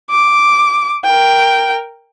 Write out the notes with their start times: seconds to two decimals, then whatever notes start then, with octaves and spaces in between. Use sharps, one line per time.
0.10 D6
1.04 A#4 G5